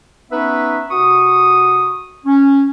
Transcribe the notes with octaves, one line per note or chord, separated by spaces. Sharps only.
B3 C#4 D#4 B4 E5
C3 F#4 C#6 D#6
C#4